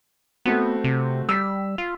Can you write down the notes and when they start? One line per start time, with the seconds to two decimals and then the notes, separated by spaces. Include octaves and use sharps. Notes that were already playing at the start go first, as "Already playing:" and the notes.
0.45 A3 B3 C4 F#4
0.84 C3
1.29 G3 E6 B6
1.78 F4